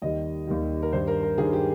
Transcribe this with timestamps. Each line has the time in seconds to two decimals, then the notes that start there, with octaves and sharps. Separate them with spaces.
0.02 D#2 D#3 G3 D#5
0.47 D#2 D#3 G3
0.83 A#4
0.92 G2 D#3 G3 C5
1.07 A#4
1.23 A#4
1.38 G2 D#3 G3 G#4
1.53 G4